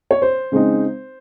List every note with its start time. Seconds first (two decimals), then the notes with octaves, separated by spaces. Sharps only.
0.11 C#5
0.22 C5
0.52 C#3 G#3 C4 D#4